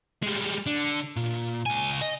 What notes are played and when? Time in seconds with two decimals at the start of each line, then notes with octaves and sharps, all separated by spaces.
0.23 G3 G#3
0.66 D3
1.17 A#2
1.66 C#2 G#5
2.02 D#5